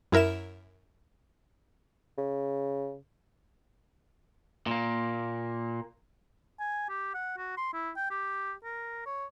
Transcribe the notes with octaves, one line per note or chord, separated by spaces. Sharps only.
F#2 E4 A#4 E5 E7
C#3
A#2 A#3
G#5
G4
F#5
F#4
C6
E4
G5
G4
A#4
C#5